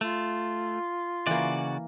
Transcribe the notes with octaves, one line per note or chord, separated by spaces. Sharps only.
A3 F4
C#3 E3 A#3 F#4 D5